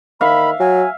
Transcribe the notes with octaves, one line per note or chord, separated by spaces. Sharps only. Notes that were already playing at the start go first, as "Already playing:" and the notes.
D#3 E5 F5 B5
F#3 G#5